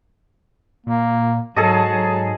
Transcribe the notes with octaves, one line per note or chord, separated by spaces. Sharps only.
A#2 A#3
G#2 F#3 F#4 G#4 A4 D#5 A5
F#3